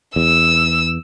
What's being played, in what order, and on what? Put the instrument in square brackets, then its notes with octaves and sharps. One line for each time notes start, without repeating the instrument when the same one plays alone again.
[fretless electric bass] E2 [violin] E6